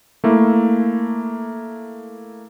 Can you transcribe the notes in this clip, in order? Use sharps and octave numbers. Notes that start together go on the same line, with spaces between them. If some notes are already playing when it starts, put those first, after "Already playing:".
A3 A#3 E4